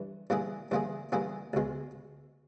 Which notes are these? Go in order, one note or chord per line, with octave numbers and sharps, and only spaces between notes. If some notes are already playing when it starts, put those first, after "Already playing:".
Already playing: G2 E3
G2 E3 A#3 E4 G#4
G2 E3 A#3 E4 G#4
G2 E3 A#3 E4 G#4
C#2 B2 G#3